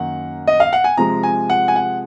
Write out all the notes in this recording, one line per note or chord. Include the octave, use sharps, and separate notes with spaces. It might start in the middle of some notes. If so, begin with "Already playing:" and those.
Already playing: F#2 D#3 A#3 F#5
D#5
F5
F#5
G#5
C3 F3 G#3 A#5
G#5
F#5
G#5
F#5